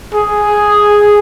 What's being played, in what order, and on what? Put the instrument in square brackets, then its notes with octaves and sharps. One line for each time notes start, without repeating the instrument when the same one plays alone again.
[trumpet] G#4